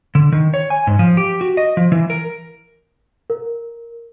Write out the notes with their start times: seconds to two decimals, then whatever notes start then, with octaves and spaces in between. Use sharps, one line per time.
0.15 D3
0.32 D#3
0.54 C#5
0.70 G#5
0.87 G#2
0.99 F3
1.17 G4
1.41 F#4
1.57 D#5
1.77 F3
1.92 E3
2.10 A#4
3.30 A#4